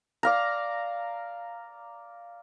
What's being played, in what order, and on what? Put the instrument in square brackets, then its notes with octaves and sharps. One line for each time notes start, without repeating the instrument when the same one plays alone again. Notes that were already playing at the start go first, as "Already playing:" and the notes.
[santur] D5 F5 A#5